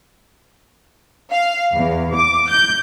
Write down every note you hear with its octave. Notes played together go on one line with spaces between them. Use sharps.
F5
E2
D6
G6